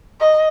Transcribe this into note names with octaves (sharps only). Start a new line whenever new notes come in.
D#5